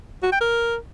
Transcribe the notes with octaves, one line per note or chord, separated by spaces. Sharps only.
F#4
G5
A#4